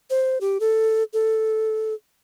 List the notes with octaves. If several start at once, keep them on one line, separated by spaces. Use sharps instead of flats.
C5
G4
A4
A4